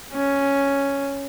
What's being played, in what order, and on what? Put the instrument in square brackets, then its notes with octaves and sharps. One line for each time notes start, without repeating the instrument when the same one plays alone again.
[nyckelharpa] C#4